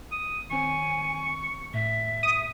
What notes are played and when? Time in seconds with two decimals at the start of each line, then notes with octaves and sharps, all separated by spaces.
0.12 D#6
0.51 D#3 C4 C#5 G#5 C#6
1.74 A2 E5
2.23 D#6